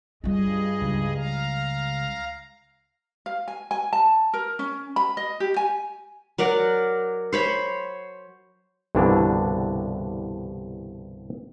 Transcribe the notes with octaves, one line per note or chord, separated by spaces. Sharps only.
G2 G3 F4 G#4 D#5
C#2
F5 A#5
F5
G#5
G#5
A5
A#4
C#4
B5
D#5
G4
G#5
F#3 A#4 D5 F#5
C5 C#5 B5
C2 G2 B2 D3 E3 D4